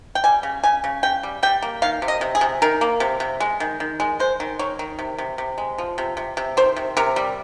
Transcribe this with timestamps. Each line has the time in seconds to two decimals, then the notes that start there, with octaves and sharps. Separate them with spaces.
0.15 G5
0.24 G3 G#5
0.43 C#3
0.64 C#3 G#5
0.84 C#3
1.03 C#3 G5
1.23 G3
1.43 G3 G5
1.62 A#3
1.82 D#3 F5
2.02 C3
2.08 D#5
2.21 C3
2.35 G#4
2.41 C3
2.62 D#3 A#4
2.81 A#3
3.00 C3
3.20 C3
3.40 G#3
3.60 D#3
3.80 D#3
4.00 G#3
4.20 G#3 C5
4.40 D#3
4.59 D#3 C#5
4.79 D#3
4.99 C3
5.18 C3
5.38 C3
5.58 G#3
5.78 F3
5.98 C3
6.17 C3
6.37 C3
6.57 D#3 C5
6.76 C3
6.97 C3 A#4
7.16 G3